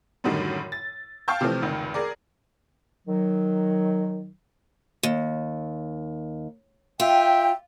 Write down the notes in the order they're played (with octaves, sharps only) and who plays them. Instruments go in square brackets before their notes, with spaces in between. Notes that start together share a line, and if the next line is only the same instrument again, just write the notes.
[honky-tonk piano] F#2 A2 D3 D#3 G3
A6
F5 G5 A5 C#6 F6 G6
C3 E3 F3 A3 C4
F1 C#2 D#3
G#4 A#4 D5
[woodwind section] D#3 F#3
[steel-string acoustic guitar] D#2
[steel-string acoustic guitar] F4 [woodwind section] E5 G5